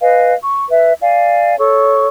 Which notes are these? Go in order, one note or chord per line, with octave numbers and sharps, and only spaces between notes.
B4 D#5 F5 G#5
C#6
B4 E5
D5 F5 G#5
A4 C#5 C#6